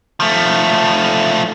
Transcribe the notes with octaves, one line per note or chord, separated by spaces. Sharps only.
F3 A3